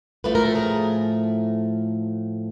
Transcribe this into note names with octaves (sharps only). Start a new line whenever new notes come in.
A2 F3 A3 B4
A#4
A4
G#4 A#4